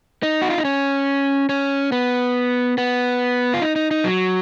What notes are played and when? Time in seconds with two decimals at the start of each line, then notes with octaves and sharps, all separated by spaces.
0.23 D#4
0.42 F#4
0.50 F4
0.58 D#4
0.65 C#4
1.49 C#4
1.92 B3
2.78 B3
3.54 F4
3.62 D#4
3.76 D#4
3.91 D#4
4.05 F#3